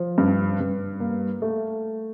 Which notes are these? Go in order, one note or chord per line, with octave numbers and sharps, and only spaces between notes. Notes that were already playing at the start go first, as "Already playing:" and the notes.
Already playing: F3
G2
G2
A#3
A3